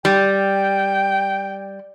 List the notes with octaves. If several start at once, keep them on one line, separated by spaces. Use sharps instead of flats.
G3 G5